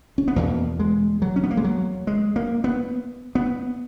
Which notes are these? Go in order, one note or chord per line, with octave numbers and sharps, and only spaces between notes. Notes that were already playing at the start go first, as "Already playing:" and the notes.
C#4
B3
E2 B2 A#3
G#3
F#3
C#4
B3
A#3
G#3
F#3
G#3
A#3
B3
B3